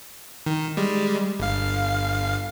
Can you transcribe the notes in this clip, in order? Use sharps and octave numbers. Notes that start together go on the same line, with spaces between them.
D#3
G3 G#3
G1 F5